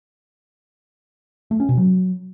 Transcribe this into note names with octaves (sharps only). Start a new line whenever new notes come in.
A3
C#4
B2
F#3